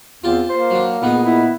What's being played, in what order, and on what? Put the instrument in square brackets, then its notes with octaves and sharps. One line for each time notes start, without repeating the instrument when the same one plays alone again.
[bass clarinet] E2 [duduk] C4 [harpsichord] F4 G4 A5
[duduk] A#3 [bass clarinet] C5
[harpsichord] F#3 D4
[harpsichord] A#1 D#4 G#4 [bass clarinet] B3
[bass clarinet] B3 [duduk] E4